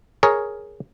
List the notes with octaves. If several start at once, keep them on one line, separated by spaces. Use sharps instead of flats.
G#4 A#4 C#5